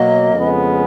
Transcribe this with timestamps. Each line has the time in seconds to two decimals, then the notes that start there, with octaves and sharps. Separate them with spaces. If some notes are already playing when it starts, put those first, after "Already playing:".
Already playing: B2 F#3 A#3 D#5
0.34 F2 C#3 G#3 B3